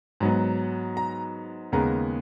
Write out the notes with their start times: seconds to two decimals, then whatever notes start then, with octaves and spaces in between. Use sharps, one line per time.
0.20 G#2 F#3 B3
0.97 A#5
1.72 D#2 C#3 G#3 B3 A#5